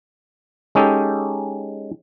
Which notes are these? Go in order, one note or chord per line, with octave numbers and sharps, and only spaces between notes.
G#3 C#4 D#4 G4 A4